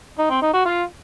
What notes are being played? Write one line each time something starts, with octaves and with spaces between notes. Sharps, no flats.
D#4
C4
D#4
F#4
F4